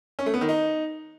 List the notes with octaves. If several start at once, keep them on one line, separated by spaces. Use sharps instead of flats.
C#4
A3
B3
D#3
D#4